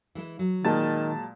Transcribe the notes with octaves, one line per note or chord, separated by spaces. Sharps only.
E3 G#3 E4
F#3
A#2 D#3 G#3 A5